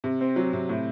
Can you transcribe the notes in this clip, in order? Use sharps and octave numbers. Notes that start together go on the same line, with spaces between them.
C3
C4
F#3
C3
A2